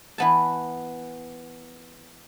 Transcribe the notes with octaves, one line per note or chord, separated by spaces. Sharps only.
E3 B3 A5